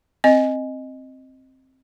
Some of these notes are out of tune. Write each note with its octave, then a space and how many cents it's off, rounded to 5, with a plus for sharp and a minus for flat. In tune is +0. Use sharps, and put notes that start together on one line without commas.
C4 +5 D#5 +0